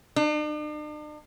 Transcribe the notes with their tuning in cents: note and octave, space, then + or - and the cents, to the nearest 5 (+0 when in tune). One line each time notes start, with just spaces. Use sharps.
D4 +45